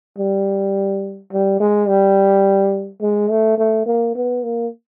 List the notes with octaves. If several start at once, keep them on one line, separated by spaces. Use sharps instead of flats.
G3
G3
G#3
G3
G#3
A3
A3
A#3
B3
A#3